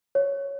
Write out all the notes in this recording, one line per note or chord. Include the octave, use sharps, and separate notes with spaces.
C#5